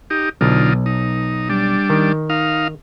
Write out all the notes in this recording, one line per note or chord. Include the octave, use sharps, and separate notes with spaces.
D#4 G4
B1 D3 D#4 F4
D#4
G3 D4
D#3
D#4 F5